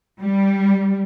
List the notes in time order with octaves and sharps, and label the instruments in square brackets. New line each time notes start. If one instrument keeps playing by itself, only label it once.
[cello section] G3